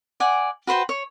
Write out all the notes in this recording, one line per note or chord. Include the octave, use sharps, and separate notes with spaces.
D5 F#5 G#5
F#4 B4 C5 G5
C#5